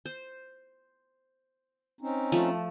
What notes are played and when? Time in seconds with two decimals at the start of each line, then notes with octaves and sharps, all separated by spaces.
0.06 C5
2.01 C4 C#4 D#4
2.32 F3 A3